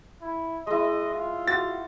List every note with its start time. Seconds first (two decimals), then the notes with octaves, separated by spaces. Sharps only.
0.22 E4
0.67 G#3 E4 D#5
1.15 F4
1.47 F#4 A6